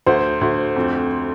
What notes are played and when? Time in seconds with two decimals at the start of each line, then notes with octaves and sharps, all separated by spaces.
0.06 D2 C5
0.41 D2
0.76 F2